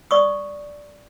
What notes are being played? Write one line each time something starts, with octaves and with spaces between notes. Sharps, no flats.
D5 C#6 D#6